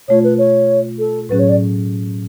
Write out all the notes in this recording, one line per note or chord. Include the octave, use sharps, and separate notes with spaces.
B2 A3 F4 C#5
B4
C#5
A4
A2 F#3 C#4 G#4 B4
C#5
D5